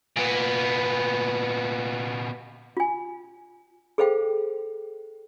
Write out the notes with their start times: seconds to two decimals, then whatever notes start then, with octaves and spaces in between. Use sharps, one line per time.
0.17 A#2 B3
2.77 F4 G#5
3.98 G#4 A4 C5 F5 G5